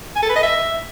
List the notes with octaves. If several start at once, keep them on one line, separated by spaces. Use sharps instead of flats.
G#5
A4
B4
D#5
E5